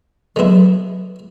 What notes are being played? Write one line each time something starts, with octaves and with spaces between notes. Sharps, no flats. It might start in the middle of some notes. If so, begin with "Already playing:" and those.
D3 F#3 G#3 B3 E4